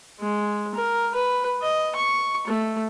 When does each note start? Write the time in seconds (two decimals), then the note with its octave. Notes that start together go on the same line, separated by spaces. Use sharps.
0.20 G#3
0.75 A#4
1.15 B4
1.62 D#5
1.96 C#6
2.47 A3